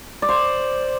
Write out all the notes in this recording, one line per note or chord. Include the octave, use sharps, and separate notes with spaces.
D5
C5